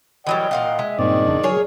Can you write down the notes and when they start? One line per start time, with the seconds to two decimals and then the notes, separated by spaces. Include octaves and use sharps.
0.27 E3 F#3 G3 D#5 G5
0.51 A#2 F5 F#5
0.79 G#3 E5
0.99 G2 A#2 D#3 C4 D5
1.28 F2 C#3 D4
1.43 F#3 G#4 A#4 C#5